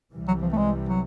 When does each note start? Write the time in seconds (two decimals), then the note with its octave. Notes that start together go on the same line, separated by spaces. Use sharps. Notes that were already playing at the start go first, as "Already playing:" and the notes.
0.14 C2 C3 E3 G3
0.28 F#3
0.42 F3
0.53 A3
0.58 G#3
0.89 F#3